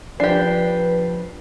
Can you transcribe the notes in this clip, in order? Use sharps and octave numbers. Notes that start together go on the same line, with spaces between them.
F3 D4 G4 B4 C7